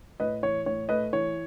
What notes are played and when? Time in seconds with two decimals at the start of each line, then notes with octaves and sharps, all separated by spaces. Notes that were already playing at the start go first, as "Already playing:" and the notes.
0.20 A2 B4 D#5
0.42 E3 C#5
0.66 A2 C#5
0.89 A3 B4 D#5
1.13 E3 C#5